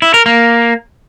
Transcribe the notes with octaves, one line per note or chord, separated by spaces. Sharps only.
E4
A#4
A#3